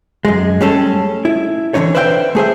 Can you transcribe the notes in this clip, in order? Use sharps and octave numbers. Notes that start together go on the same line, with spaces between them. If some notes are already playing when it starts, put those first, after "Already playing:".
F#2 G#3
G3 A3 C#4 G#4 A4
E4
D3 E3 C4 D#4 C#5
B4 C5 D5 E5 F5 G5
A3 G#4 C5 E5